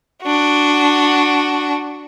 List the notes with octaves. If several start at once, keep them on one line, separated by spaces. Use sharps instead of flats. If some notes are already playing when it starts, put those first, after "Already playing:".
D4 F#4